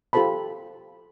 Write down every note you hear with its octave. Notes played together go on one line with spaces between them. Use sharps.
F4 G4 A4 C5 A5 B5